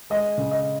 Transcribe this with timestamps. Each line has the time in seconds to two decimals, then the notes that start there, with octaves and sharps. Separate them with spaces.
0.10 G#3 D#5
0.38 C#3
0.51 D#5